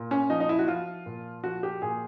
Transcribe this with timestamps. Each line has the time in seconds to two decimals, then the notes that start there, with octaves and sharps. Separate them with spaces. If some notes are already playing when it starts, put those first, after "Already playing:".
Already playing: A#2
0.11 C#4
0.30 F3 D#4
0.40 D#4
0.49 E4
0.59 F#4
0.68 F3 F4
1.06 A#2
1.44 F3 F#4
1.63 G4
1.82 A#2 G#4